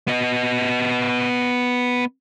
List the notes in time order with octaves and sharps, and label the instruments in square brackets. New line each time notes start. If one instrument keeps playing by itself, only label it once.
[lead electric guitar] B3 D#5